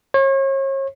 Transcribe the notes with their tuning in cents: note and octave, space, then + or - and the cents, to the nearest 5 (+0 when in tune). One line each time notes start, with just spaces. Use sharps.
C#5 -35